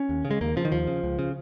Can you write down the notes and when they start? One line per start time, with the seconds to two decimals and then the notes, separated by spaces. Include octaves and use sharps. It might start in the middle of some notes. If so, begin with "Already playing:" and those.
Already playing: C#4
0.09 D#2
0.25 C#3
0.31 G#3
0.41 D#2 A#3
0.56 C#3 F3
0.65 D#3
0.72 D#2 F3
0.87 C#3
1.03 C#2
1.19 C#3